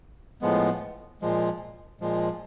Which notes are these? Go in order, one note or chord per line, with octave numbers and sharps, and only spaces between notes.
A2 F3 G#3 B3
A#2 F3 G#3
A#2 F3 G#3